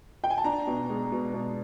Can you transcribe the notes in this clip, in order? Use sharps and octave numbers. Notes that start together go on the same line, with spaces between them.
G5
G#5
A5
D4 A#5
B2
G#3
B2
B2